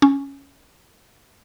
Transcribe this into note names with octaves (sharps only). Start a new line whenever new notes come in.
C#4